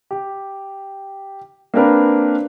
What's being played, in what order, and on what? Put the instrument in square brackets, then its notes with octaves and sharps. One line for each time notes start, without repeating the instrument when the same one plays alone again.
[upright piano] G4
A#3 C4 D4 A#4 B4